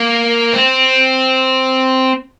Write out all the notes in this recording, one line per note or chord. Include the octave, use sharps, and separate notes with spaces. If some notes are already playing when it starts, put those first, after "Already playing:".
Already playing: A#3
C4